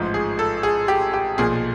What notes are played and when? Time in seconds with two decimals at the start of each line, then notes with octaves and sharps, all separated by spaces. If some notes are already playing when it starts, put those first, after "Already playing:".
Already playing: A1 G#2 F3
0.14 G#4
0.39 A4
0.63 G#4
0.88 G4
1.14 G4
1.38 B1 A#2 F3 G#4